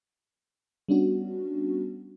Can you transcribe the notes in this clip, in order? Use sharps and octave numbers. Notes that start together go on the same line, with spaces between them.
G3 B3 C#4 D4 F#4